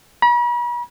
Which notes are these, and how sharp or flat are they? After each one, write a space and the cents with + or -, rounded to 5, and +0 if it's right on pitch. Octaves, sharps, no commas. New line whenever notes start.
B5 -45